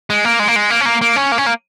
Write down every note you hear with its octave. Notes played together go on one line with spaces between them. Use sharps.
G#3
A#3
G#3
A#3
G#3
A#3
C#4
A#3
A#3
C#4
A#3
C#4
A#3